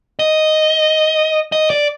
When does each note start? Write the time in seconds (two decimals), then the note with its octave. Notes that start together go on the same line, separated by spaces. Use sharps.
0.19 D#5
1.52 D#5
1.70 D5